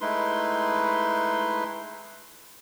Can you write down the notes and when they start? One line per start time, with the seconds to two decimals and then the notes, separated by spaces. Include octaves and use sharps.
0.01 G#3 A3 D#4 E4 B4 C6